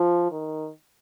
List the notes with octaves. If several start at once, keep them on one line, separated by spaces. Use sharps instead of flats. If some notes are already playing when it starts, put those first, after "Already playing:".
Already playing: F3
D#3